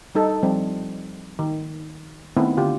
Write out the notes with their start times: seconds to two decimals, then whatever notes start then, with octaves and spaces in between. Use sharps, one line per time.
0.15 G3 D#4 A4
0.43 F3 G3 C4
1.39 D#3
2.37 D#3 A3 B3 C4 E4
2.57 D3 F4 G4